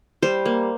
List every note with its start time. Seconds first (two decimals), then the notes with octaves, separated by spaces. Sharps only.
0.22 G3 C5
0.46 A#3